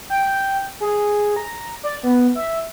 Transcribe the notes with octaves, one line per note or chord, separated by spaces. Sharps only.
G5
G#4
A#5
D5
B3
E5